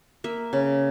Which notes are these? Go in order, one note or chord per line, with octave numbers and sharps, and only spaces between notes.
A#3 E5
C#3